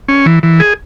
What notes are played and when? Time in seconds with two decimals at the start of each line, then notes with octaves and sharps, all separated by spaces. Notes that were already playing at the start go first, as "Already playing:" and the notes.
0.08 C#4
0.26 E3
0.43 E3
0.60 G#4